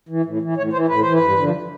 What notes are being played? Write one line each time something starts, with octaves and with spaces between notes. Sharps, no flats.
E3
A2
E3
A2 C#5
E3 C5
A2 B4
E3 C5
B4
G2
D3 F3